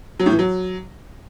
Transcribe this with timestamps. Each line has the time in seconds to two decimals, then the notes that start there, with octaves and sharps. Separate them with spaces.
0.20 F#3
0.26 A2
0.32 E3
0.39 F#3